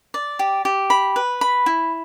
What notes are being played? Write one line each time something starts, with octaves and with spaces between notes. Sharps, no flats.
D5
G4
G4
B5
B4
B5
E4